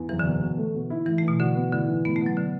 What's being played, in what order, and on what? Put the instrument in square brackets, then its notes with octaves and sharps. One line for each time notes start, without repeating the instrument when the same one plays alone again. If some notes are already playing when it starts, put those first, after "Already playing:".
Already playing: [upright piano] E2
[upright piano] F#1 [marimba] E3
[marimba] D3
[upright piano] B2
B2
A3
B2
E4
[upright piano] A2 [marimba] E3
[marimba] A3
[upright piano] E3
[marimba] B2
[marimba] D3 [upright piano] F#4
[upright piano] B3
[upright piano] A2 [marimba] D3
[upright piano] E3
[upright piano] A2 [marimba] B3
[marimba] A3
[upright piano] B3
[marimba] F#3
D3